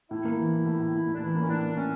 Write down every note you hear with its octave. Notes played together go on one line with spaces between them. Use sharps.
A2 E4
A#3
E3
A2
A2
A2
A2
A2
D4
E3 E4
A#3
C#4
A2 D4
A#3
A2 C#4